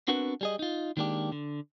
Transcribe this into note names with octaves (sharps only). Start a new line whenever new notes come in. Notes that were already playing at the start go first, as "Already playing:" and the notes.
B3 C4 D4 F#4 A#4 B4
G3 G#4 D#5
D#4 F4
D#3 G#3 A#3 D4 G4
D3